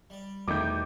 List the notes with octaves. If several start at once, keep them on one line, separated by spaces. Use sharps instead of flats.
G3 D5
E2 B2 D#3 A3 D6 G6